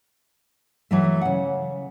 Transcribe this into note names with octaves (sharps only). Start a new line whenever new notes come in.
E3 F#3 A3
C#3 F#5